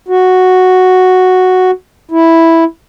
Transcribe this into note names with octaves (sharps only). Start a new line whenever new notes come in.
F#4
E4